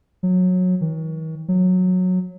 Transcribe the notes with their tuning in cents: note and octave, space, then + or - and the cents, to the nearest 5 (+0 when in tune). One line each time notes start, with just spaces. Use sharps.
F#3 -20
D#3 +45
F#3 -15